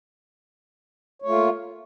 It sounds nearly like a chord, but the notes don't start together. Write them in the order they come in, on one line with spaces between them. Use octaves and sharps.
C#5 A3 F4 A#3